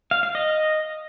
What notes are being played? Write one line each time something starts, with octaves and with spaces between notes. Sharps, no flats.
F5
F5
D#5